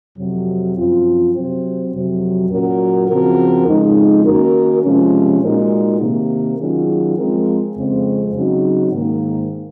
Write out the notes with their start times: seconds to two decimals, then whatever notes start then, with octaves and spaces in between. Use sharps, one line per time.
0.18 F2 C3 F#3
0.76 F#2 F3 C4 F4
1.34 C3 F#3 C4
1.93 F2 C3 F#3
2.50 A#2 F#3 C#4 F#4 A#4
3.09 C#3 F3 C4 F#4 A#4
3.67 F2 C#3 G#3 D#4
4.26 D#3 A#3 C#4 F#4 A#4
4.83 C3 F3 G#3 C#4
5.43 A#2 G#3 D#4 F#4 A#4
6.00 C3 D#3 A#3
6.58 D#3 F#3 C#4 F4 G#4
7.17 F3 G#3 C4 F4 A#4
7.76 F2 C#3 G#3 C4
8.34 C#3 F#3 C4 D#4 F#4
8.92 G#2 D#3 A#3